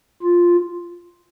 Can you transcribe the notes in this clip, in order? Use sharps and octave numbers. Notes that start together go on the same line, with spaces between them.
F4